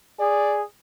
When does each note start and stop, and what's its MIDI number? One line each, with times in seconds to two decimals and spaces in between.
0.20 0.62 68
0.20 0.61 74